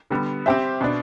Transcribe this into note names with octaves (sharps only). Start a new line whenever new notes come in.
D3 G3 B3
C4 G4 C5 E5
B2 B3 D4